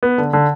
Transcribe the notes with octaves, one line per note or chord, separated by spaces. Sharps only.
B3
D3
D3